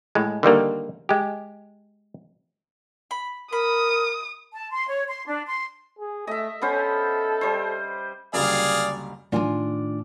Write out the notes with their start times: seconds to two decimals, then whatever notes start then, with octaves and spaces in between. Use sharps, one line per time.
0.15 A2 G#3
0.43 D3 D#3 G3 A#3
1.09 G#3 G4
3.11 B5
3.53 A#4 B5 D#6
4.53 A5
4.70 C6
4.88 C#5
5.09 C6
5.27 D4
5.46 C6
5.99 G#4
6.27 A3 D#5 E5
6.62 B3 C#4 A4 C5
7.41 G3 C5
8.34 F#1 D2 G3 G#4 D5 F5
9.32 A2 D#3 D4 F4 G#5